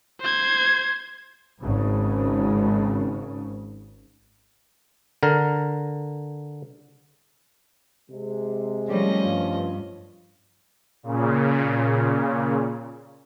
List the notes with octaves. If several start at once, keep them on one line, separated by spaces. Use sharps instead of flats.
C5 G#6
G#1 G#2 C#3
D3 A#4
C3 G#3
F3 G3 A3 C#4 D#5
G2 F3 F4
A#2 C#3